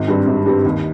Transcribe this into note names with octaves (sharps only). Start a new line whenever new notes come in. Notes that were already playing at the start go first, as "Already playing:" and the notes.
Already playing: G#1
G2 G3 C4
G#1
G2 G3 C4
D#2